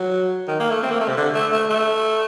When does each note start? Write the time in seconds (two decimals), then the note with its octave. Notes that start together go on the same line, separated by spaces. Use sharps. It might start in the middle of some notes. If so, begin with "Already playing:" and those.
Already playing: F#3
0.48 D#3
0.60 A#3
0.71 A3
0.83 C4
0.91 A#3
1.00 A3
1.08 C3
1.17 D3
1.34 A3
1.53 A3
1.70 A3